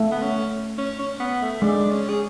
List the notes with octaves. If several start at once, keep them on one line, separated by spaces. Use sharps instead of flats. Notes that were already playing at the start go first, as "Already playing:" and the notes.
Already playing: A3
B3
C#4
C#4
C#4
B3
A3
G#3 D4
C#4
G#4